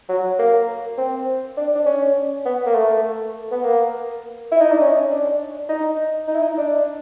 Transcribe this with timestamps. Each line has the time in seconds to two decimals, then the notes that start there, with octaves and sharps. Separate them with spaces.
0.09 F#3
0.39 A#3
0.97 C4
1.57 D4
1.75 D4
1.86 C#4
2.45 B3
2.66 A#3
2.75 A3
3.51 B3
3.63 A#3
4.51 E4
4.61 D#4
4.72 D4
4.81 C#4
5.10 D4
5.69 D#4
6.28 D#4
6.35 E4
6.42 D#4
6.58 D4